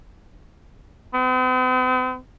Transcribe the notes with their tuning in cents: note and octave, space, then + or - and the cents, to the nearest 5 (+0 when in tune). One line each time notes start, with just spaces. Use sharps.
C4 -45